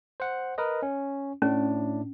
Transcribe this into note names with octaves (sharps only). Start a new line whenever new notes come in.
C5 F#5
A#4 B4 D#5
C#4
A2 C#4 D4